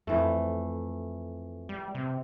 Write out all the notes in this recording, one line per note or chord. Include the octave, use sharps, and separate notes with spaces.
F2 E3 A3
G3
C3